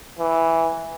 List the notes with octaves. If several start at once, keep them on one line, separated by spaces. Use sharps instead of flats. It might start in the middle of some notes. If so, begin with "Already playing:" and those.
E3